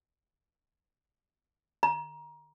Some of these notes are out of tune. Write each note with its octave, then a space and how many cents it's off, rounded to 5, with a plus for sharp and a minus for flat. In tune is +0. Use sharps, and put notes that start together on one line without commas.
A#5 +25